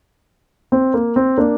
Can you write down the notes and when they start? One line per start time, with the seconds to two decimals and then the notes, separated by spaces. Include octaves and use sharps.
0.72 C4
0.94 A#3
1.16 C4
1.37 A#3 D4